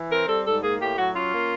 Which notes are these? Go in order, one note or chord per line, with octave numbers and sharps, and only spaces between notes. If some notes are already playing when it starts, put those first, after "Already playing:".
Already playing: E3
C4 A#4
G3 A4
G#2 A4
A#3 G#4
A2 G4
F#3 F#4
C#4 F4
A#3